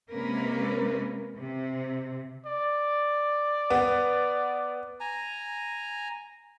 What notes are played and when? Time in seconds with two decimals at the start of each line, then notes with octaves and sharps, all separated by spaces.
0.12 C3 G#3 A#3 C#4 A#4 B4
1.36 C3
2.46 D5
3.70 B3
5.00 G#5 A#5